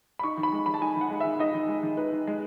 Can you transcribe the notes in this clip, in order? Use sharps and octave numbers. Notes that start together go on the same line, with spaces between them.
B5
D#4 C#6
D#3
B5
G#3
D#3 B5
A5
D#4 G#5
D#3 F#5
G#3
D#3 E5
D#4 D#5
D#3
G#3
D#3
D#4 B4
D#3
G#3